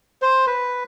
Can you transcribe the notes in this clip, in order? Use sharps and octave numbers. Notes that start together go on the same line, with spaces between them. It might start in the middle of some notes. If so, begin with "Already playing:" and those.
C5
B4